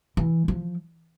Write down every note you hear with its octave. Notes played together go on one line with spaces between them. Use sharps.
E3
F3